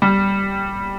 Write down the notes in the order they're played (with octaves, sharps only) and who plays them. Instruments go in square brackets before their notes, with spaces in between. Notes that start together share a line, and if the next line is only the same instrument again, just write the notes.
[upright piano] G3